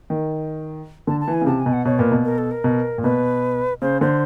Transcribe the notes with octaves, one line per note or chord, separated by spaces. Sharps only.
D#3
D3 A5
A5
E3
G#5
C#3
C3 A5
G#5
B2
F#5
B2 C#5
A#2 B4
B2
A#4
A4
A#4
B2
A#2
B2 B4
C#3 C5
D3 C5